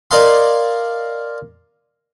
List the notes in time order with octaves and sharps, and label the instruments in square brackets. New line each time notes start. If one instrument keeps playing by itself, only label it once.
[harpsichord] A#4 D5 D#5 F5 G#5 C6